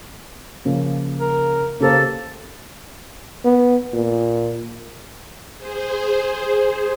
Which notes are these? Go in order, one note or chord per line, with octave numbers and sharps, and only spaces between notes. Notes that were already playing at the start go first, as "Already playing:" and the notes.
C#3 F3 A#3
A#4
C#3 A#3 G4 A4 C5
B3
A#2
G#4 C5